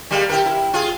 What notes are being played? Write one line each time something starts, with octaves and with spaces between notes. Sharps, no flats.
G3 G#3 A#3
E4 G4 A#4
E4
F4 G#4